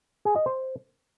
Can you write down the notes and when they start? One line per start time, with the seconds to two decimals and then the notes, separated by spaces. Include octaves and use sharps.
0.25 G#4
0.36 D#5
0.46 C5